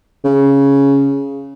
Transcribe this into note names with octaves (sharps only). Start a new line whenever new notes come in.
C#3